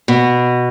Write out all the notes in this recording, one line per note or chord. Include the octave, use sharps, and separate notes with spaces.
B2